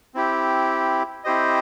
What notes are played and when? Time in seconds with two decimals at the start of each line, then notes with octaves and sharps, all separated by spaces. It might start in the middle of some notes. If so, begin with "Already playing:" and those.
0.14 C4 E4 G4
1.24 C4 E4 G4 C5 D#5